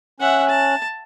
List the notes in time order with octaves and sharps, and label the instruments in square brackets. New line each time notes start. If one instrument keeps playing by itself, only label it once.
[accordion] C#4 F#6 [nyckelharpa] E5 F#5
[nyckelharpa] A5